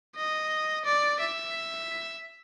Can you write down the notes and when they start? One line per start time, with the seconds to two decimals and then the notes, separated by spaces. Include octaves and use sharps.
0.16 D#5
0.85 D5
1.20 E5